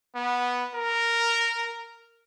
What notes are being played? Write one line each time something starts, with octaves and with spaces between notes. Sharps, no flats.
B3
A#4